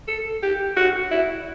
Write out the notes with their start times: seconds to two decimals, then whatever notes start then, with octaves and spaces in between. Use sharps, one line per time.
0.08 A4
0.43 G4
0.76 F#4
1.11 E4